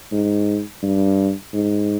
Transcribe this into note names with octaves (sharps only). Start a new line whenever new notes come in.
G#2
G2
G#2